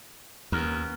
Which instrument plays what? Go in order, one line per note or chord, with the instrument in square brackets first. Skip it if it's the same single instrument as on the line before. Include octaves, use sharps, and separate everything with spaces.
[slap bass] D#2 [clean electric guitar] B3 C#4 A#4